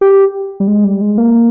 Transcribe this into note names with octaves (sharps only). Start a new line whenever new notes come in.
G4
G3
G#3
G3
G#3
A#3